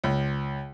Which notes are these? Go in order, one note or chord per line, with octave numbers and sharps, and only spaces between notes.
C#2